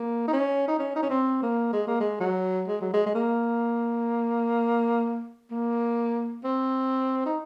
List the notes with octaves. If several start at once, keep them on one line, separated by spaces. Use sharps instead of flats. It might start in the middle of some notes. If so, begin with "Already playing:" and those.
Already playing: A#3
D#4
C#4
D#4
C#4
D#4
C#4
C4
A#3
G#3
A#3
G#3
F#3
G#3
F#3
G#3
G#3
A#3
A#3
C4
D#4